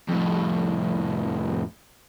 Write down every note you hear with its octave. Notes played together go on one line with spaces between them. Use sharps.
F2 A2